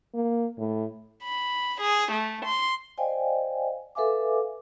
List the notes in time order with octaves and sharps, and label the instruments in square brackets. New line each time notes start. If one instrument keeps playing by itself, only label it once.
[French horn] A#3
A2
[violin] B5
G#4
A3
C6
[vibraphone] C5 D5 D#5 F5 G5 G#5
A4 B4 E5 F5 G#5 D6